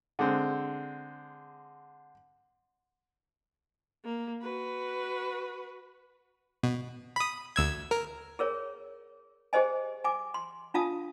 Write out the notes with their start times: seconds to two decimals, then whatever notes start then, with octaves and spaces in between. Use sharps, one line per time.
0.19 D3 G#3 C4
4.04 A#3
4.41 F#4 B4
6.63 B2
7.16 B5 D#6
7.56 D2 E6 G#6
7.91 A#4
8.39 G#4 A#4 C#5
9.53 G4 G#4 C5 D#5 G#5
10.04 G#5 D6
10.34 C6
10.74 D4 F4 F5 A5 D#6